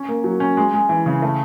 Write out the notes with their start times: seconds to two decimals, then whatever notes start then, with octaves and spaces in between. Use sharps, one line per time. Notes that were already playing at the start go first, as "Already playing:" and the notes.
Already playing: C#4
0.08 A#3
0.24 F#3
0.40 C#4
0.57 G#3
0.74 G#3
0.89 E3
1.06 C#3
1.22 A3